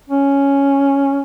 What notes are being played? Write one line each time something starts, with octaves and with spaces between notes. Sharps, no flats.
C#4